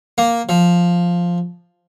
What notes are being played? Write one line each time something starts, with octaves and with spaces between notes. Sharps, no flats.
A#3
F3